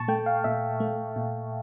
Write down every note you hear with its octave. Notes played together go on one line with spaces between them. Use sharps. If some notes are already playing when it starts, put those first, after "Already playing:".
Already playing: A#2 A5 C#6
A3 G5
F5
A#2 E5
A3
A#2